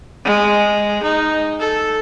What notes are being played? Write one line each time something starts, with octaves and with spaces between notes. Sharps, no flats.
G#3
D#4
A4